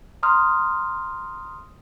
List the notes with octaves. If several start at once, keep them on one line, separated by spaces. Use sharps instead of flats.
A#5 C6 D#6 F6